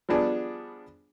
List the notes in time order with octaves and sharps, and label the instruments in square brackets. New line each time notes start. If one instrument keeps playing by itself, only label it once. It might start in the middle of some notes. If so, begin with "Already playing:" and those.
[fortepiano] F3 G3 B3 D4 G#4